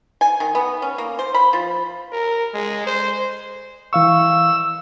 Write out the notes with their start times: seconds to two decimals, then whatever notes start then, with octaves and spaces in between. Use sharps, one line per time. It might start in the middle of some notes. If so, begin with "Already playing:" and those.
0.21 G#5
0.40 D#3
0.55 B3
0.82 C#4
0.98 A#3
1.19 C5
1.34 B5
1.53 F3
2.12 A#4
2.54 G#3
2.86 C5
3.93 E3 F5 C#6 E6